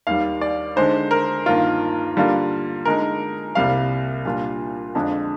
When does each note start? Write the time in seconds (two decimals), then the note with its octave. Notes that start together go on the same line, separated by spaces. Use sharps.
0.07 D#2 D#3 G3 F5
0.41 D5
0.76 D3 G#3 D#4 C5
1.11 A#4
1.46 G2 D#3 A#3 F4
2.17 D3 G3 A#3 F4
2.85 D3 G#3 D#4 A#4
3.55 C2 C3 G3 A#3 F5
4.25 A#2 G3 D4 F4
4.95 F2 D3 F3 G#3 D4